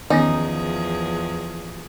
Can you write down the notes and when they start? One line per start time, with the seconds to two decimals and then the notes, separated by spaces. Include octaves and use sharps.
0.10 E2 D#3 F3 B3 C#4 D#4 G#4